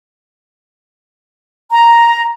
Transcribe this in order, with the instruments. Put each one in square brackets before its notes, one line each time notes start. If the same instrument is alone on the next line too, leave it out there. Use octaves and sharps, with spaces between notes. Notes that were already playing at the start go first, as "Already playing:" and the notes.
[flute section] A#5